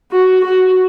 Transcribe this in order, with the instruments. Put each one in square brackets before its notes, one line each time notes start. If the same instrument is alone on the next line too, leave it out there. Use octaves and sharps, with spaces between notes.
[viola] F#4
F#4